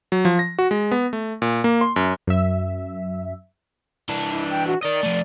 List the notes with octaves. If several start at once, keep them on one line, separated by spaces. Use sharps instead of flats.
F#3
F3
A#6
F#4
G#3
B3
A3
A#2
A#3
C6
F#2
F#2 E5
E3 D4
E4
G5
F#4
A#4 D5 D#5
F3 A3